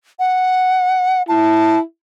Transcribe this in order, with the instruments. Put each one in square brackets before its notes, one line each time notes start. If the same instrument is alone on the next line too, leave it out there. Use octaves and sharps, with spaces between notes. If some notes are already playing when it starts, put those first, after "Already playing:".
[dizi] F#5
[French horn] E4 [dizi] A5